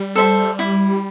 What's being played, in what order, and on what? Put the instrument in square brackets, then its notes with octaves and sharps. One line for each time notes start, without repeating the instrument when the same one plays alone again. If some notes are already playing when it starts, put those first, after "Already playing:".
Already playing: [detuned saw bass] G3
[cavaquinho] A4 C5 E5
E4